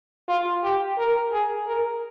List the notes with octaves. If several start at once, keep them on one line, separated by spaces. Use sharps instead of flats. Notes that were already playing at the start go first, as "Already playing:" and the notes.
F4
G4
A#4
G#4
A#4